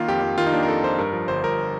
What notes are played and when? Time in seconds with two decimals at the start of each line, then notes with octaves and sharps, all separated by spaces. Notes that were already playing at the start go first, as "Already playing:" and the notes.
Already playing: D#3 A#3 F4
0.08 F2 G4
0.23 F2
0.38 D#3 F4
0.47 D#4
0.53 A#3 D4
0.63 A#4
0.68 F2 A4
0.83 F2 C5
0.98 G2 A#4
1.13 F3
1.28 G1 C5
1.44 G1 A#4